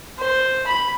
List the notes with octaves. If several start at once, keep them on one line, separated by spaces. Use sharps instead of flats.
C5
B5